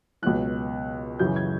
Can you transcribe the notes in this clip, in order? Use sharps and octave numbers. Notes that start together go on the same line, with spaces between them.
C#2 B2 F#3 F#6
F#2 C#3 E3 G6
G#6